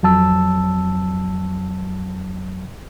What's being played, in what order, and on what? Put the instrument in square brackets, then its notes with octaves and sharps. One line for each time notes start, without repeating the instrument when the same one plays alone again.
[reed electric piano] F2 F#3 A5 E6